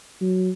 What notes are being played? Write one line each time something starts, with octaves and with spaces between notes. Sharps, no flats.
F#3